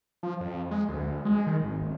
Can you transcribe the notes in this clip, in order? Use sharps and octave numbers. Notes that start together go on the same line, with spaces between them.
F3
F2
G#3
D2
G#3
D#3
G#1
D#1